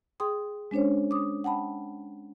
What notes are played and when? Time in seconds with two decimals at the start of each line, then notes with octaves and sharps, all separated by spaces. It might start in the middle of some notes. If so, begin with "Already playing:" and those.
0.20 G#4 G5 C6 D#6
0.71 G#3 C#4 D4 C5 C#5
1.11 D6 D#6
1.44 F#5 G5 A5 B5